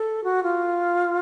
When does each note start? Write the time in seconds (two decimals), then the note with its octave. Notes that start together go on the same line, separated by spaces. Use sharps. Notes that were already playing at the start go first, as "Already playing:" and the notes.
Already playing: A4
0.24 F#4
0.43 F4